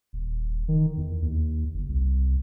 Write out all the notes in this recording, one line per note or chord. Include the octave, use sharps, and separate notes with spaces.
D#1
D#3
E2
D#2
F#1
C2